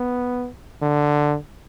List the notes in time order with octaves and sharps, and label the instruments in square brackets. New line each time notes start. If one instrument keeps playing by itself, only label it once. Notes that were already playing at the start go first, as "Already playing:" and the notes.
Already playing: [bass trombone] B3
D3